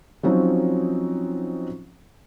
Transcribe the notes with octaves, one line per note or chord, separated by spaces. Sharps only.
F3 F#3 C4 C#4 D#4